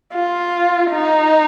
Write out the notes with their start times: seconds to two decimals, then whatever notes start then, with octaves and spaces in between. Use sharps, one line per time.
0.14 F4
0.92 D#4